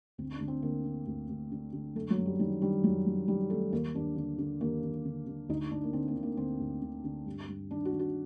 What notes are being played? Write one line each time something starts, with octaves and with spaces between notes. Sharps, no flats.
D2 C4
D4
D2
C4
D3 A#3
D3
D2
D2
D3
D3
F#2 A3
F#3
F#2
G3
D#3 G3
D#3 G3
F#2 F#3
F#2
D#3 G3
D#3 A3
D#2 A#3
D#2 D4
D3
D3
D#2 A#3
D#2
D3
D3
D2 D#4
D2 D4
A#3
D3 C4
A#3
D3
A#3
D2 C4
D2
D3
D3
G2
G2
D#3 D4
F#4
D#3
F#4